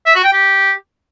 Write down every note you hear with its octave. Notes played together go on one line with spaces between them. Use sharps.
E5
F#4
G5
G4